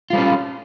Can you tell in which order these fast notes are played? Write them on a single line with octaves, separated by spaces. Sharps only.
F4 G3 A4 C#4